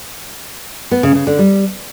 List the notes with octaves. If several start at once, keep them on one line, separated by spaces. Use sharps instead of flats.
B3
C#3
C#3
D3
G3